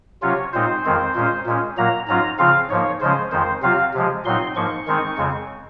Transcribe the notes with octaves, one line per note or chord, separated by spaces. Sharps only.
C3 F#3 C#4 F4 C#5
A#2 G#3 C4 D#4 C5
F2 D#3 G#3 C4
A#2 G#3 C#4
A#2 G#3 C#4
A#2 F#3 A#3 A#5
G#2 F#3 C#4 F4 A#5
C#3 F3 C4 F4 F5
G#2 F3 A#3 C#5
C#3 F3 G#3 C#4 C5
F2 D#3 G#3 C5
C3 F#3 C4 F4 F5
C3 F3 G#3
A#2 F#3 C4 D#4 C6
G#2 F3 A#3 C#6
D#3 G#3 C4 D#4
F2 C#3 G#3 C4